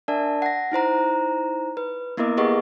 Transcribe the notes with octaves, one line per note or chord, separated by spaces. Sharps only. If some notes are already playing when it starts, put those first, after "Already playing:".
D4 A#4 D5 E5 A5
F#5 A#6
D#4 E4 C5 A#5
B4
A#3 B3 E4 A#4 D#5 D6
G4 G#4 B4 D#5 F#5 C#6